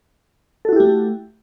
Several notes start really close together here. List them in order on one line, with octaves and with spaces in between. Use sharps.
A4 F#4 E4 G4 A3